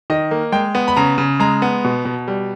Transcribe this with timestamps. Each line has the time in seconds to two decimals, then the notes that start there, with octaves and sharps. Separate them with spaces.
0.10 D#3 D#5
0.31 A#3
0.52 G#3 G5
0.75 B3
0.88 B5
0.96 C#3 A#5
1.18 C#3
1.40 G#3 A#5
1.62 B3
1.84 B2
2.05 B2
2.28 G3